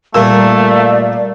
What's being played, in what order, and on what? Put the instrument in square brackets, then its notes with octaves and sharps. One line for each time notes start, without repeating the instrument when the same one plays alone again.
[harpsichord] A#2 [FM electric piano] G3 A#4 E6 [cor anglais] A3 [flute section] D5 F5